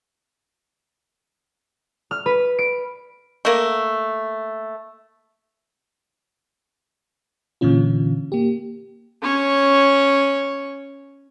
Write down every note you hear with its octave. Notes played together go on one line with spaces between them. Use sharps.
F6
B4
D7
A3 A#3
A#2 D3 E3 C#4 F4
A#3 G4
C#4 C#5